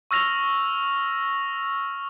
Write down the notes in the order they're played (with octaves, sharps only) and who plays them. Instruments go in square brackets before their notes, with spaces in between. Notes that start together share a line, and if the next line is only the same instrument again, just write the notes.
[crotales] C#6 E6 F6 A#6 F7